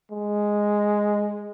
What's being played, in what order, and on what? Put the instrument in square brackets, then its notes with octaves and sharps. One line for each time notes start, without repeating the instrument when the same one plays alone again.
[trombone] G#3